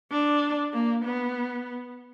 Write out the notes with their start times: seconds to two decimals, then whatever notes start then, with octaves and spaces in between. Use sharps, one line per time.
0.11 D4
0.73 A#3
1.05 B3